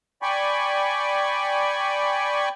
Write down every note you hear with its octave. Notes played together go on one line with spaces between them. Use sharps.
D5 G5 G#5 B5 C#6